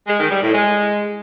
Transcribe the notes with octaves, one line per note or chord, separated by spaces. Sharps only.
G#3
D#3
G3
A2
G#3